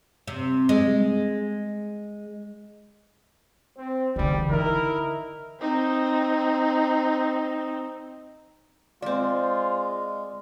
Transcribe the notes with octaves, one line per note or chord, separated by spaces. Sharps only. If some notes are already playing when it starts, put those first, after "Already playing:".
C3
G#3
C4
G#2 D3 E3 G3
D3 D#4 E4 A#4
C4 D#4
G#3 C4 F4 D5 E5